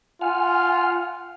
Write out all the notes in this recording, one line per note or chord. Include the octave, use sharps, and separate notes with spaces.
F4 F#5 G#5 F6